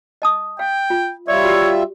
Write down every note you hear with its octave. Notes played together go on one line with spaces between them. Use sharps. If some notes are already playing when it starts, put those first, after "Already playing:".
D#5 A5 D#6
F5 G5
F4
G3 F4 C#5 D5 E5
F#4 G4